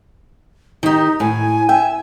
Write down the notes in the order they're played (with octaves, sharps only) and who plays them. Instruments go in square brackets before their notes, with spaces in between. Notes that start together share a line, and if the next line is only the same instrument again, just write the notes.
[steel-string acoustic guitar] D#3 G4 [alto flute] D#4
[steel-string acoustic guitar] A2 [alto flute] G#5
[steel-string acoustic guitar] E5 [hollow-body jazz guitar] G5